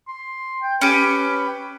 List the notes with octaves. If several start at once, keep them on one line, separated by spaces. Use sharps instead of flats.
C6
G5
C#4 G4 B4